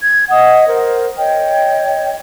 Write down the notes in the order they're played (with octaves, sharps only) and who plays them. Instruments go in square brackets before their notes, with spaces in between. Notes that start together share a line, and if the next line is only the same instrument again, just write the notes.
[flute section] G#6
D#5 F#5 D#6
A#4 C5
C#5 D#5 G5